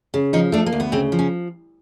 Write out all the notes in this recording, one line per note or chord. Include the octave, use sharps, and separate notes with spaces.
C#3
F3 D#4
A3 D4
A#3
D2
B3
C#3 C4
F3
C#4